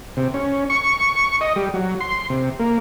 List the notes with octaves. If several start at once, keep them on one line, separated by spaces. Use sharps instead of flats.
C3
C#4
C#6
D#5
G3
F#3
C6
C3
A#3